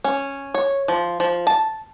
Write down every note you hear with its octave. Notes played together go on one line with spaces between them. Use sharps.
C#4
C#5
F3
F3
A5